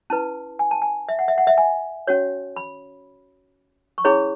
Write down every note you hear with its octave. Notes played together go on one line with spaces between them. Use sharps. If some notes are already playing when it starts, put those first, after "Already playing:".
C#4 E4 B4 A5
G#5
A5
G#5
E5
F#5
E5
F#5
E5
G#5
C#4 F#4 C#5
B5
C#6
C#4 E4 G#4 C#5 B5